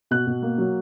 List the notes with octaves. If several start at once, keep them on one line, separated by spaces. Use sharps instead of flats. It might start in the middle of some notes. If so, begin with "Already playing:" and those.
B2 F#6
B2
A#3
F#3